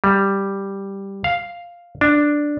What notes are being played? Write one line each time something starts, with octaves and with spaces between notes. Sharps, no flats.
G3
F5
D4